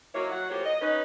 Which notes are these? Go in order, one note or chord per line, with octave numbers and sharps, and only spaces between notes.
D#3 F#3 A#3 E4 C#5
F#3 F#5
A2 F3 A#3 G4 C5 C#5
D#5
C#4 D#4 B4